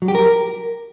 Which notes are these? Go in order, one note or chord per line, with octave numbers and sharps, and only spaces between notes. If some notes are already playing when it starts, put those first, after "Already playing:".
F#3
G4
A#4